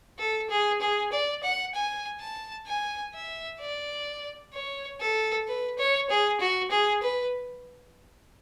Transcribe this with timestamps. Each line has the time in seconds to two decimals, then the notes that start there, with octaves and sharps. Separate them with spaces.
0.19 A4
0.50 G#4
0.81 G#4
1.12 D5
1.43 F#5
1.74 G#5
2.20 A5
2.67 G#5
3.15 E5
3.60 D5
4.54 C#5
5.01 A4
5.47 B4
5.78 C#5
6.09 G#4
6.40 F#4
6.71 G#4
7.02 B4